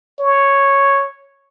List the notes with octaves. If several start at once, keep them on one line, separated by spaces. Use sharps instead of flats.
C#5